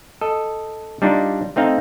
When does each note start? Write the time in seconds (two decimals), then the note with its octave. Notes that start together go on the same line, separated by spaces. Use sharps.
0.21 A4 D#5
1.02 G3 D4 D#4 F4
1.56 A3 C4 D#4 F5